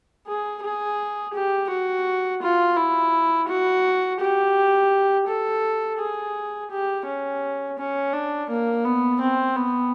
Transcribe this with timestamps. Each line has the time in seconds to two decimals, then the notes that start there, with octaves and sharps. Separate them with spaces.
0.27 G#4
0.63 G#4
1.34 G4
1.70 F#4
2.42 F4
2.77 E4
3.48 F#4
4.20 G4
5.28 A4
5.99 G#4
6.71 G4
7.06 C#4
7.78 C#4
8.13 D4
8.50 A#3
8.85 B3
9.21 C4
9.56 B3